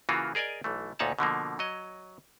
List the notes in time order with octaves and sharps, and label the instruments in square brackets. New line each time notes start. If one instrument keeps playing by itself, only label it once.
[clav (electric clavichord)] C#3 E3 A#3 F4 F#4
G#4 A#4 D5 D#5 G#5
B1 E3 A3
D2 A#2 D#4 C#5 F#5 A5
B2 D3 F3 A#3
F#3 C#5 D#5